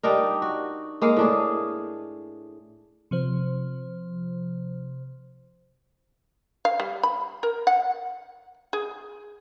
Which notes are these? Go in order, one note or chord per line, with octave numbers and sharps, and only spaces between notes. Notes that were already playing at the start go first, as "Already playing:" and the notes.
G3 D4 D#4 A#4
F#4
G#3 A#3 F5
A2 D4 G#4
C3 F3 C5
F5
G3
B5
A#4
F#5
G#4